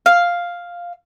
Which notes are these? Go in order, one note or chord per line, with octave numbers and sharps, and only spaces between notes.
F5